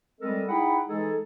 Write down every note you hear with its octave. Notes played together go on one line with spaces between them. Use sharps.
G3 G#3 C4 A4 A#4 D#5
D#4 E4 G#4 F#5 G5 B5
E3 G#3 D#4 G#4 A4